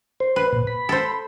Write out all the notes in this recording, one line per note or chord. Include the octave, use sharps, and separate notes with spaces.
C5
B4
A#2
B5
A4 C5